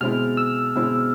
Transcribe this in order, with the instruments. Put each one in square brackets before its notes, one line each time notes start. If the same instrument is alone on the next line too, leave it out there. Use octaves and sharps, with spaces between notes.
[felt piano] B2 G#3 C4 E4 [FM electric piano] F6
[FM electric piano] E6
[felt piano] B2 G#3 C4 E4